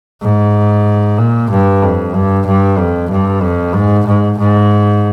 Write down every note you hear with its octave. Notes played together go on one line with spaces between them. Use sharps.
G#2
A#2
G2
F2
G2
G2
F2
G2
F2
G#2
G#2
G#2